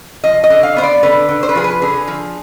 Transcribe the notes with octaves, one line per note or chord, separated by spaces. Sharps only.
F3 D#5
D#5
D3
F5
B3 C5
D5
D3 B4
D3
C5
B4
F3 G#4
B4
D3 G#4
F3